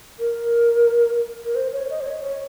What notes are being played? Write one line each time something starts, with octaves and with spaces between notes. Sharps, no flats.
A#4
A#4
C5
C#5
D#5
C5
C#5
C#5